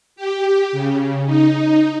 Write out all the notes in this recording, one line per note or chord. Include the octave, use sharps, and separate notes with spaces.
G4
C#3
D#4